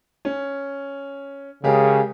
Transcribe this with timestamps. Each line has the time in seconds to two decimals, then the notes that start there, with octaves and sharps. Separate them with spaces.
0.25 C#4
1.64 C#3 G#3 G4 A#4